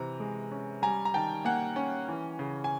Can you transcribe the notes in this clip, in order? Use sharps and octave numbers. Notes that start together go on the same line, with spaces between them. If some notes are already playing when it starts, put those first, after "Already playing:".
Already playing: C3 E3 A#5
G#3
C#4
G3 G#5 A#5
A#5
D#3 G5 A5
A#3 F#5 G#5
C#4
E3
C#3
G#5